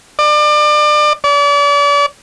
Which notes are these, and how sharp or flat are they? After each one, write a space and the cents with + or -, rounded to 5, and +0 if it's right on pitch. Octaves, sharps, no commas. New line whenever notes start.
D5 +30
D5 -40